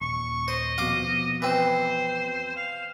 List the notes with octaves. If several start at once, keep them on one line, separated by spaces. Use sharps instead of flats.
D#1 C#6
C5 D#5
F2 B2 F5 D6 D#6
E3 C4 C5
F5